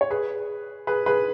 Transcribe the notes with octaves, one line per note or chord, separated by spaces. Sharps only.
C#5
G#4 B4
G#4 B4
G#4 B4